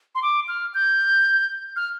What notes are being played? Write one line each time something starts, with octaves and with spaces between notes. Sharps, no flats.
C6
D6
F6
G6
F6